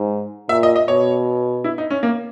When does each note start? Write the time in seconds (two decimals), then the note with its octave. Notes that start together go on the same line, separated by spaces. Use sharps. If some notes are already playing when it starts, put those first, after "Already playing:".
Already playing: G#2
0.49 A#2 E5
0.63 D#5
0.76 D#5
0.88 B2 C#5
1.64 E4
1.78 D#4
1.90 C#4
2.03 A#3